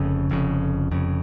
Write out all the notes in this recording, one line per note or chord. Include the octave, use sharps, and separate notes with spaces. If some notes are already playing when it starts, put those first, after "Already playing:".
Already playing: F1 F2 C#3
F1 F2 C#3
F1 F2 C#3